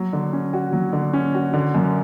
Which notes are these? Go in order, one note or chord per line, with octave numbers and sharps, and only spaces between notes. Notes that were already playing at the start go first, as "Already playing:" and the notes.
Already playing: F#3
D3
C#4
F#4
F#3
D3
C#4
F#4
D3
F#2